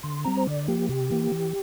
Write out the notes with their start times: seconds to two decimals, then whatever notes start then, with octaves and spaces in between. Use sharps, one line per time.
0.03 D3 C6
0.25 G3 C4 A#5
0.37 C5
0.47 D3 D5
0.68 F3 A#3 G4
0.89 C3 G4
1.10 E3 A#3
1.32 E3